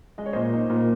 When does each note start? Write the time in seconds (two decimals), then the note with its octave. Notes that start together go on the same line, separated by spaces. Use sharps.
0.18 G#3 D#5
0.26 C#5
0.33 A#2 C5 D#5
0.53 D#4
0.70 A#2